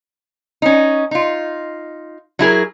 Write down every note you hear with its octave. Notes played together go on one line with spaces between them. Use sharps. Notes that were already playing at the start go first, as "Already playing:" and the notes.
C#4 D#4
D#4 F4
F#3 E4 G#4 A#4